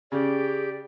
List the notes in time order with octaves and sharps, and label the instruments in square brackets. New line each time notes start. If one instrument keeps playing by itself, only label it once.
[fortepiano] C#3 [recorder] G4 [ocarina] G#4 [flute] D5